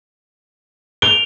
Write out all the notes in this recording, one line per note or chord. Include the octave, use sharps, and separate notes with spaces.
D7 F7 G7